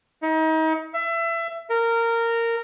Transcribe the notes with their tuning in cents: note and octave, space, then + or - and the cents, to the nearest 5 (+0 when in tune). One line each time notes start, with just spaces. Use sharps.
D#4 +35
E5 +25
A#4 -15